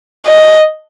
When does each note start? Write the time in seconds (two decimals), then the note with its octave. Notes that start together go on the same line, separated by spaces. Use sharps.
0.26 D#5